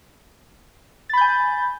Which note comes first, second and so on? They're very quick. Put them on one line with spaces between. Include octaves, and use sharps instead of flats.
A6 B5 G6 G#5